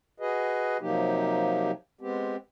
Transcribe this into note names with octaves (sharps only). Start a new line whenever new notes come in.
F#4 G#4 B4 D#5
C3 F3 F#3 A#3 D#4 G4
G#3 B3 C4 G4